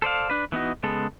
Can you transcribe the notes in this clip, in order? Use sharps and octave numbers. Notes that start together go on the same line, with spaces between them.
A4 C5 D5 F5
D4 B4
E3 B3 D#4 F#4
C#3 G#3 B3 A4